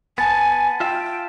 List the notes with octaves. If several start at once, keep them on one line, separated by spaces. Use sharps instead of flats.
B3 G#5 A5 A6
F4 E5 G5